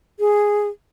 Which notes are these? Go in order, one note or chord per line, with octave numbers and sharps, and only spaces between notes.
G#4